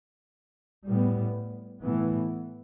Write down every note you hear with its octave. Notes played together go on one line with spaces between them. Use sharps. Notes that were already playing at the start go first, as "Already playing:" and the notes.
A2 G3 B3
A2 E3 B3